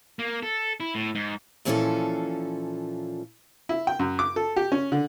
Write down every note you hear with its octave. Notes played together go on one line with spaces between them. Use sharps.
A#3
A4
E4
A2
G#2
A#2 E3 F3 C#4 F4 A4
E4
G5
F#2
D6
A4
G4
C#4
D3